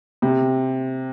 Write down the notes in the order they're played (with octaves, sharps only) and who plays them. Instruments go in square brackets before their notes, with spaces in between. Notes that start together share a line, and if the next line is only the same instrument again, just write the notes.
[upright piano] C3